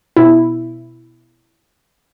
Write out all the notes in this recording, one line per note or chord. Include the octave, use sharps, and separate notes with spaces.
B2 E4